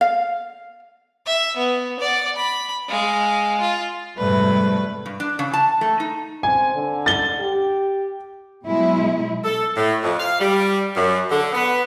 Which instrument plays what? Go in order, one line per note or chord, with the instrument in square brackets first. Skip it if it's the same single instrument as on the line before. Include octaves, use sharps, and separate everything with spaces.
[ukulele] F5
[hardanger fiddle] E5
B3
D5 F#5
B5
G#3 F5
F4
[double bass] F2 G#2 [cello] C3 A3 [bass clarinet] G3 [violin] B4
[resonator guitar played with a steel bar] G2
D4
C#3
A5
A3
D#4
[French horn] C4 [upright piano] G#5
[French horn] D3
[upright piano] A6 G7
[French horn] G4
[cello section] B2 F#3 G#3 E4
[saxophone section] A4
A2
F2
F5
G3
F#2
D3
B3